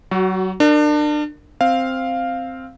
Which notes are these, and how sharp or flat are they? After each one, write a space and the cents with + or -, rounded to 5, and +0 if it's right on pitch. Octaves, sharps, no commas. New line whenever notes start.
F#3 +30 F#4 +5
D4 +30 A#4 -20
C4 +0 F5 +0